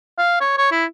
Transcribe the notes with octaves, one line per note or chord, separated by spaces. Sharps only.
F5
C#5
C#5
E4